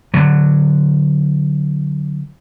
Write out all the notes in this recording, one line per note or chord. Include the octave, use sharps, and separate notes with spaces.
D3 F#3